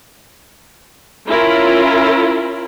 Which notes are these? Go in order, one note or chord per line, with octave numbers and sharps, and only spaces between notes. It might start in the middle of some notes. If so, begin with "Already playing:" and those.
C#4 E4 F4 A#4